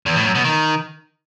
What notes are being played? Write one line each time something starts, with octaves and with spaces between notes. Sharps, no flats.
E2
A2
F#2
B2
D#3